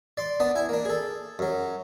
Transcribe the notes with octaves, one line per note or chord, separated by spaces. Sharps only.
D5 C6 D6
B3 D4 D5 D#6
E4 G#5
A#3 D4
G#4 A4
F#2 F#3